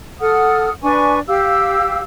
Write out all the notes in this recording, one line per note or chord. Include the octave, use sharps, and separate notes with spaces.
A4 F#5 D#6 F6
D4 B4 G#5 C#6
G4 F5 E6